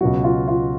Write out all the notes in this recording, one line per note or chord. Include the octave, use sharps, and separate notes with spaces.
C#2 B2 F#3 F#4
F4
F4